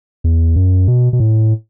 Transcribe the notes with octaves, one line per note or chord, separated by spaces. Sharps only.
E2
F#2
B2
B2
A2